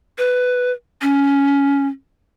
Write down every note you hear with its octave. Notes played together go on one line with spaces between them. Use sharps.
B4
C#4